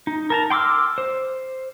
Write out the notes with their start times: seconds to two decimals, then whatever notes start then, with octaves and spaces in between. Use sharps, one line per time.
0.07 D#4
0.30 A#4 A5 A#5
0.50 G5 C6 D6 E6 F6
0.98 C5